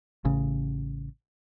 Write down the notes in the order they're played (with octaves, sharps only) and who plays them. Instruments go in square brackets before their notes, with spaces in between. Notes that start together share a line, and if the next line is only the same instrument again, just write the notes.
[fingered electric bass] A1 C#3